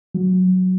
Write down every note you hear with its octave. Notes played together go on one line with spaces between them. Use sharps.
F#3